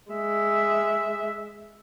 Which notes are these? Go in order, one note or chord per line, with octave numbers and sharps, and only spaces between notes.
G#3 E5